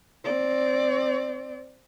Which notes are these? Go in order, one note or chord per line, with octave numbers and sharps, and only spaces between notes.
C4 D5